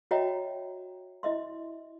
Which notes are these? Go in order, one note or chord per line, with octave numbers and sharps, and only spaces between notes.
F#4 C#5 D#5 E5 G5 A#5
E4 D#5 E5 C6